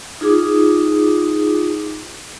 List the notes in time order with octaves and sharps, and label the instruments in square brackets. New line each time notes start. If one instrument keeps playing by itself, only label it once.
[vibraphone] D#4 F4 G#4 D6 D#6